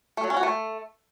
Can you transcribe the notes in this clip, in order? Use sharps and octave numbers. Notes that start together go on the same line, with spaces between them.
A3
F#3
C#4
F#4
A3